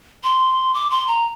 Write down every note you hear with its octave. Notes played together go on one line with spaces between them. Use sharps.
C6
D6
C6
A#5